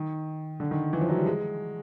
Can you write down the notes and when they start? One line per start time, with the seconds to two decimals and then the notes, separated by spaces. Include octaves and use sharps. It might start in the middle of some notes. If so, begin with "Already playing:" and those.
Already playing: D#3
0.60 D3
0.71 D#3
0.93 E3
1.01 F3
1.09 F#3
1.17 G3
1.26 G#3